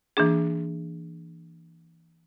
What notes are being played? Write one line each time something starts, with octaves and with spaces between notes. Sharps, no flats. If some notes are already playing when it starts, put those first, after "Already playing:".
E3 A#3 D4 G#4